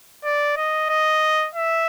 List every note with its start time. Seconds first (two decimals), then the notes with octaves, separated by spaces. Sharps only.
0.24 D5
0.57 D#5
0.90 D#5
1.55 E5